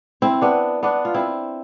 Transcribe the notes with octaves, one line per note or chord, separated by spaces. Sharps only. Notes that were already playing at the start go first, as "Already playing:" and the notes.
C4 E4
B3 D4
B3 D4
F4
C4 E4